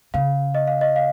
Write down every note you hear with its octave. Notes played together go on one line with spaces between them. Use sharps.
C#3 F5
D#5
F5
D#5
F5